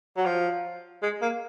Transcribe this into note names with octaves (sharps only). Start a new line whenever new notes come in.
F#3
F3
G#3
A#3